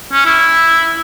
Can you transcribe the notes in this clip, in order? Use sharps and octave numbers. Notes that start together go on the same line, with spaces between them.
C#4
E4